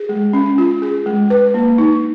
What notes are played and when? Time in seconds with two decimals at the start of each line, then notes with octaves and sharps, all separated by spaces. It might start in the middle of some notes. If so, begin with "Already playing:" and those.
Already playing: G#4
0.09 G#3
0.33 C#4
0.58 F4
0.82 G#4
1.06 G#3
1.30 B4
1.54 A#3
1.78 D#4